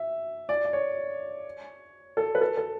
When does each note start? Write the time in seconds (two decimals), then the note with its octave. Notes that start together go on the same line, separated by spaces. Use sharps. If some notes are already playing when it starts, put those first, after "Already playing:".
Already playing: E5
0.49 D5
0.65 D5
0.73 C#5
2.17 A4
2.35 B4
2.41 A4
2.57 A4